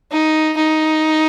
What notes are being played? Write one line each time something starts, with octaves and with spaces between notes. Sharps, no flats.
D#4
D#4